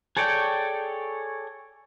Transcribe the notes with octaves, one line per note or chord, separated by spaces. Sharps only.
G#4 A4 C#5 D5 G5